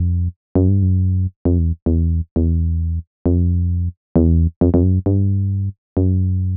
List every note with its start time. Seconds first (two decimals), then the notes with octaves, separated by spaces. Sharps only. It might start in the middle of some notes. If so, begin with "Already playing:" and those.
Already playing: F2
0.55 F#2
0.69 G2
0.83 F#2
1.45 F2
1.59 E2
1.86 E2
2.36 E2
3.26 F2
4.16 E2
4.61 F2
4.74 F2
4.83 F#2
5.06 G2
5.97 F#2